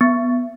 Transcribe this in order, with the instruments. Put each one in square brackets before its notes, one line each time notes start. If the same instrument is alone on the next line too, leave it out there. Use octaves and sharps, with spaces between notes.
[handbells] B3